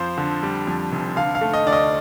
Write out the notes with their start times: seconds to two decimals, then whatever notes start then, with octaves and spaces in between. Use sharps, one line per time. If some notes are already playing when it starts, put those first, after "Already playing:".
Already playing: F2 F3 C5
0.18 D3
0.43 G3
0.67 F2
0.92 F1
1.16 D3 F5
1.35 F5
1.41 A3
1.53 D#5
1.66 D2 D5
1.73 D#5